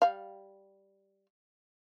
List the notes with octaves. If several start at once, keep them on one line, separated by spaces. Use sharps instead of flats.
G3 F5